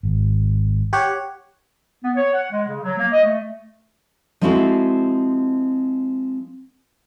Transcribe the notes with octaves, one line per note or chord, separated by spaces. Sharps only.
G#1
G4 C#5 F#5
B3
C#5
F#5
G#3
C#3
F#3
A#3
D#5
A3
F3 G#3 C4 E4 F#4 A4